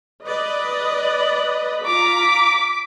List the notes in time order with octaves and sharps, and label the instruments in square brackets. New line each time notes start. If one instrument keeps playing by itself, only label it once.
[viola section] B4 D5 D#5
[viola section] F4 A#5 [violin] D6 B6